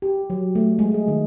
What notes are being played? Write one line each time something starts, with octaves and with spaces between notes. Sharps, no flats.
G4
F#3
A3
G#3
G#4
D#3